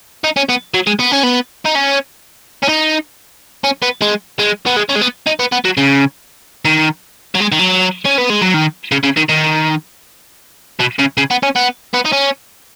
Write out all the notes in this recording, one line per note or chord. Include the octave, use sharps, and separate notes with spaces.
D#4
C#4
B3
F#3
G#3
B3
C#4
B3
D#4
C#4
C#4
D#4
C#4
B3
G#3
G#3
B3
G#3
C#4
G#3
B3
D#4
B3
B3
F#3
C#3
D#3
F#3
G#3
D#3
F#3
C#4
B3
G#3
F#3
D#3
C#3
C#3
D#3
D#3
B2
C#3
C#3
B3
C#4
B3
B3
D#4
C#4